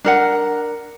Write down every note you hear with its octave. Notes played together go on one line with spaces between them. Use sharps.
D4 A#4 F#5